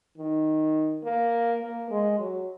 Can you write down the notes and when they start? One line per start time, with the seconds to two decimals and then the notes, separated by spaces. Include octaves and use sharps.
0.18 D#3
1.04 A#3
1.62 A#3
1.91 G#3
2.19 F#3